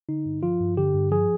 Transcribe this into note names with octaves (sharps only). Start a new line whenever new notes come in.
D3 D#4
G2
F3 F4
G2
D3 G4
G2
F3 G#4